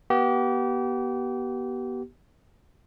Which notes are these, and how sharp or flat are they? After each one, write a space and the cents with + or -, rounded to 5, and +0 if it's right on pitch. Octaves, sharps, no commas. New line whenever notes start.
B3 -30 G4 -30